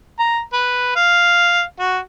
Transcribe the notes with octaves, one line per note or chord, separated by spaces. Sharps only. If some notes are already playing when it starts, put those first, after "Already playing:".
A#5
B4
F5
F#4